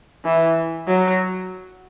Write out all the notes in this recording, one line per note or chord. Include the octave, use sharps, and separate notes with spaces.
E3
F#3